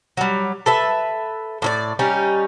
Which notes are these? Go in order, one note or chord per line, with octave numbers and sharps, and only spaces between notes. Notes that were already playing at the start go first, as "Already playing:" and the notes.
F#3 G3
A4 B4 E5
A2 E4 D5
G3 C#4 D#4